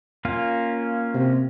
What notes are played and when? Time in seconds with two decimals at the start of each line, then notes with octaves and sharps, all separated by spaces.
0.25 A#3 C#4 F4
1.14 C3